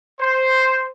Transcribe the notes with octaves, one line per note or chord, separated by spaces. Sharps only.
C5